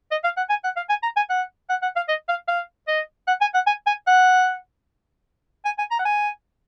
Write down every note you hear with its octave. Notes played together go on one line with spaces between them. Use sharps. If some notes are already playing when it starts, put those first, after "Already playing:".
D#5
F5
F#5
G#5
F#5
F5
G#5
A#5
G#5
F#5
F#5
F#5
F5
D#5
F5
F5
D#5
F#5
G#5
F#5
G#5
G#5
F#5
G#5
G#5
A#5
F#5
G#5